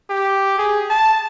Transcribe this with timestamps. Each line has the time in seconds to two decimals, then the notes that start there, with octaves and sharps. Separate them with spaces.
0.10 G4
0.58 G#4
0.90 A5